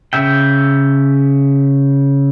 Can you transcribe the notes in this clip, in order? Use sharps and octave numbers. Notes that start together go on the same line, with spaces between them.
C#3 E5 G5